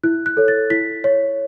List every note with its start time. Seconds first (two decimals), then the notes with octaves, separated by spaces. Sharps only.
0.03 E4 F#6
0.26 F#6
0.37 A4 C#5
0.48 A6
0.70 E4 B6
1.04 C#5